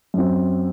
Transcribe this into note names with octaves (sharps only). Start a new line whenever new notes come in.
F#2 F#3 C4